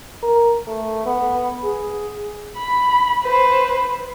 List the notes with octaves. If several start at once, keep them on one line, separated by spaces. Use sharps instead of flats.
A#4
A3
B3
G#4
B5
B4 C5